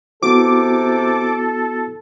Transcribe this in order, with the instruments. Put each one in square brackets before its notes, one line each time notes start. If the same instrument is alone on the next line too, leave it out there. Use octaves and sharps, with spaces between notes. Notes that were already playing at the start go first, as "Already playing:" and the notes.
[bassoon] C3 [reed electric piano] B3 E4 F#4 [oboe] A4 [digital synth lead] D6